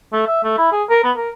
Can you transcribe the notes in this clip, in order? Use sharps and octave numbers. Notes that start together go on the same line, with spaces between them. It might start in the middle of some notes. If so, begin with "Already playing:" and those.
A3
E5
A3
E4
G#4
A#4
B3
A#4